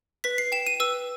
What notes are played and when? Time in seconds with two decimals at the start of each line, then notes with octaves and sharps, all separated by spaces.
0.24 B4 B6
0.38 C7
0.52 G5 E7
0.66 D#7
0.80 B4 E6